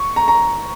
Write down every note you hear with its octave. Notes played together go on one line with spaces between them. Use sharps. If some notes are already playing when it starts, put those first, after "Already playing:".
Already playing: C#6
A#5
A#5